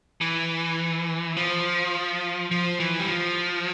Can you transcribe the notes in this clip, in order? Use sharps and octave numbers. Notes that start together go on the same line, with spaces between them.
E3
F3
F3
E3
G3
F3